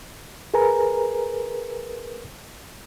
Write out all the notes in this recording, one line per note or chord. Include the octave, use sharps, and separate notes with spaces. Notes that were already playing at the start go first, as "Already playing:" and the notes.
G#4 A#4 B4 G#5 A#5